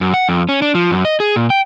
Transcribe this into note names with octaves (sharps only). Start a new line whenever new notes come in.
F#2
F#5
F2
C#4
D4
F3
F#2
D#5
G#4
A#2
G5